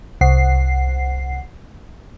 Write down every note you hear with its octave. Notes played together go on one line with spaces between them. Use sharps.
C2 F#5 C7